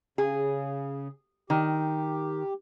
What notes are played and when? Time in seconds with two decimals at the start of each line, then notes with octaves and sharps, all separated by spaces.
0.18 C#3 G#4
1.50 D#3 G4